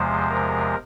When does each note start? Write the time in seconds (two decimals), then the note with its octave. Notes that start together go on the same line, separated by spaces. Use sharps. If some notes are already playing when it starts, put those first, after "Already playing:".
Already playing: E2 C3 F3 G#3 C5
0.30 A#4